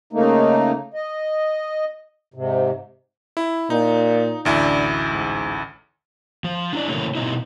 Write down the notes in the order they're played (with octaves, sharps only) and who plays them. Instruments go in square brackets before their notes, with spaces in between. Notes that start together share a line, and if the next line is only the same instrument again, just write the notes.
[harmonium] C#3 A3 A#3 D#4
D#5
G#2 C3
[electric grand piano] E4
[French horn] A#2 [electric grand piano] D#4
[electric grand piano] A1 D2 E4 [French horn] D4
[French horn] G#2
[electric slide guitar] F3
D4 E4 D5
A2 C#3 E3 A#3 A4 C#5
B2 C4 D#4 E4